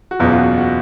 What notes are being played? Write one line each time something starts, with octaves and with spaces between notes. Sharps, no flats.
F#4
F#1 E2 B2 F#3 F4
F4
F#4
F#4